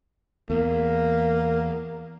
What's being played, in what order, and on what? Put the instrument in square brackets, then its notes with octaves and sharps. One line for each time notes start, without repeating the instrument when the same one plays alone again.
[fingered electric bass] E2 [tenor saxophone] A#3